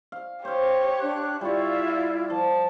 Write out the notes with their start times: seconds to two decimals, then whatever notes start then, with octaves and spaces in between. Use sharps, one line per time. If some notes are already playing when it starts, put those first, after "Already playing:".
0.12 F5
0.45 G4 C5 C#5 F5
1.01 D4 F#6
1.41 G3 E4 F4 D5 E5 F5 C#6
2.30 F3 A5